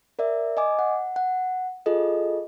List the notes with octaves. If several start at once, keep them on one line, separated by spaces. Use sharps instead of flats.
A#4 D5 E5
D#5 G#5 D6
F#5
F#5
F4 G#4 A4 D#5